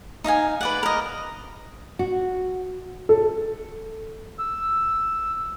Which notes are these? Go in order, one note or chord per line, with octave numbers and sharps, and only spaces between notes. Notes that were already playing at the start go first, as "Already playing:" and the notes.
D#4 D#5 F5 G#5
B4 D5 F#5
A#4 D#5
F#4
A4
E6